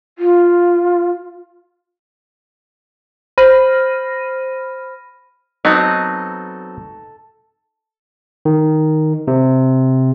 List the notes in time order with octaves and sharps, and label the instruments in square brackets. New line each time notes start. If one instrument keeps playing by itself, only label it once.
[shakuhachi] F4
[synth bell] C5 B5 F6 A#6 D#7
[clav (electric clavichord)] F#3 B3 C4 [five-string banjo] D#4 [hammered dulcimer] A4
[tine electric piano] D#3
C3